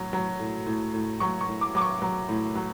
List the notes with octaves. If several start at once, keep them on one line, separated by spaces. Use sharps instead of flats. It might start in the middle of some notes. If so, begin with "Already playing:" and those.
Already playing: A2 F#3
F#3
A2
A2
A2
F#3 C#6
C#6
A2
D6
F#3 D6
C#6
F#3
A2
F#3